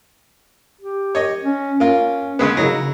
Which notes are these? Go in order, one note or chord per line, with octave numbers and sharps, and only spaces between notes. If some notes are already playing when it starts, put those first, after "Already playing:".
G4
C#5 D#5
C#4
A#3 C#4 F4
C#3 G#3 B3
C#3 F#3 D#4 E4